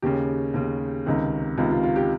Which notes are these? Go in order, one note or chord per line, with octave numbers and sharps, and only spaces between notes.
D#2 C#3 G4
D#2 C#3
C#2 C3 D#3
C#2 C3 D#3 F4
F4
F4
G4